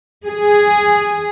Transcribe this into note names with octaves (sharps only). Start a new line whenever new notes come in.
G#4